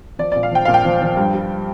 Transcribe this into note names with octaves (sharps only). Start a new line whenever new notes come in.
F3 D5
D5
A#2
F5
F3 G5
A#2 F5
G5
F3
F3
G2
G3